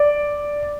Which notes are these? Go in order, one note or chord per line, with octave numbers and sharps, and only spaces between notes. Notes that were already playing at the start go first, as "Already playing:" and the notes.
Already playing: D5